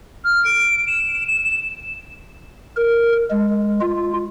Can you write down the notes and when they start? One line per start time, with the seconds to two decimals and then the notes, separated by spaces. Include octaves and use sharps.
0.24 F6
0.44 D7
0.87 E7
1.27 E7
1.43 E7
2.76 A#4
3.30 G#3
3.81 F4